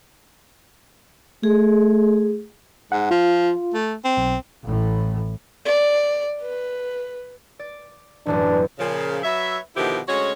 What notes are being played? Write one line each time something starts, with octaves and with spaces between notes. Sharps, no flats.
A3 G#4
G#2 F#5
F3 F4
A3
C4
B1
A1 A2
D5
B4
D5
E1 A1 F#2 D4
A#2 C#3 F3
F#3 B4 C#5 E5
B2 D3 D#3 F3 E4 G4
D2 G#3 C#4 F#4 C#5